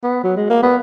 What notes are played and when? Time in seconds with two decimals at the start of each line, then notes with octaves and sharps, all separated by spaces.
0.03 B3
0.24 F#3
0.36 G#3
0.50 A#3
0.63 B3